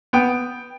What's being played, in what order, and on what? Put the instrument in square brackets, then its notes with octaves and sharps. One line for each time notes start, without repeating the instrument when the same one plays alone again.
[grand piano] B3 G5